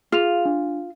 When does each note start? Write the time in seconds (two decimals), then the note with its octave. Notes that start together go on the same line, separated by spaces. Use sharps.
0.12 F4 G#4 F5 F7
0.45 D4